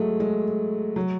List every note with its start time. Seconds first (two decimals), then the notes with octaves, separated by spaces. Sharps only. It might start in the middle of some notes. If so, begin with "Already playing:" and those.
Already playing: F#3 G#3 A3
0.20 G#3
0.96 F#3